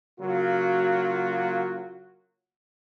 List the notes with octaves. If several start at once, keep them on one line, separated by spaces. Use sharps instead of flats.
C#3 F#3 A#3 F4 F#4